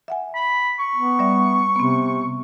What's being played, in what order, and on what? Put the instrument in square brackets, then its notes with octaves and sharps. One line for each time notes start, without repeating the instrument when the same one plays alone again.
[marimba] E5 F#5 G#5
[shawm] B5
C#6
[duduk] B3
[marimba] G3 D5 E5
[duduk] C3 [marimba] B3 C4